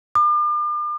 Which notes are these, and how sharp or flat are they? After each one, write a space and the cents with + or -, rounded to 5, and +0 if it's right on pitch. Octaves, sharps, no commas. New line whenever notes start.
D6 +40